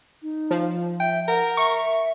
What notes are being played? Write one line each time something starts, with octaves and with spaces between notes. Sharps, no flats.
D#4
F3
E5 G5
A#4 F#5
E5 C#6